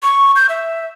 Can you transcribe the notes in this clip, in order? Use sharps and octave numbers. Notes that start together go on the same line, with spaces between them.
C#6
G6
E5